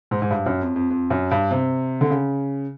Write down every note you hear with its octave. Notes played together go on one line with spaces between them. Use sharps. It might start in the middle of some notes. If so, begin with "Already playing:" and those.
G#2
G#2
G2
F#2
F2
F2
F2
F#2
G2
C3
D3
C#3